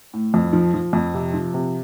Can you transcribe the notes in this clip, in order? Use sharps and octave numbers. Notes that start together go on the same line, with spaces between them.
A2
F2
F3
F3
F2
C3
F3
C3